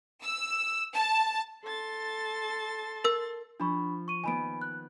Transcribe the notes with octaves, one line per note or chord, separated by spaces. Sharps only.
E6
A5
A4 C6 A6
A#4 E6
F3 D4 B5 C#6
C#6 D#7
D#3 B3 G#5 B5 D7
F#6